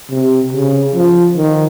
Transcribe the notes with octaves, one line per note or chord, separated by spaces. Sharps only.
C3
C#3
F3
D#3